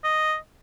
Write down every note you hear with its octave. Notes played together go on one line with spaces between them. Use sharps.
D#5